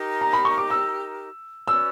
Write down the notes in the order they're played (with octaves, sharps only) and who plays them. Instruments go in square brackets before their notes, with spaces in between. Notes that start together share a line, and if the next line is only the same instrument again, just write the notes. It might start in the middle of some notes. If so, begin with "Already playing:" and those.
Already playing: [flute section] D#4 G4 A#4
[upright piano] A#5
B5
C#6
D6
E6
[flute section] C#4 F#4 B4 D5 [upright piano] E6